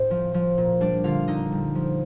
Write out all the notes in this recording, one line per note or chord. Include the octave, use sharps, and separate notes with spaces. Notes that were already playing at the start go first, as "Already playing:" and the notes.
Already playing: A2 C4 C5
F3
F3
A#2
G3 D4 D5
D3 F4 F5
D3 D#4 D#5
G3
F3